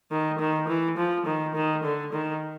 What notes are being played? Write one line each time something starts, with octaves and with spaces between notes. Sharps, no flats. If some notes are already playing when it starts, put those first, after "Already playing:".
D#3
D#3
E3
F3
D#3
D#3
D3
D#3